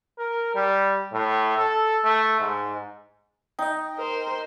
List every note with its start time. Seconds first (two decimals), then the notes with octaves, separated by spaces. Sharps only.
0.18 A#4
0.55 G3
1.13 A2
1.58 A4
2.04 A3
2.40 G#2
3.59 D#4 D#5 G5
3.95 A#4 C5